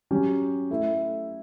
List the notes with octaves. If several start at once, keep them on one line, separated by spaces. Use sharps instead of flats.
F#3 C#4 G4
A3 E4 A4